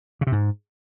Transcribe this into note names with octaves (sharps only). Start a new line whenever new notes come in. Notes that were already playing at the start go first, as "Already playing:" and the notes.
C#3
C3
G#2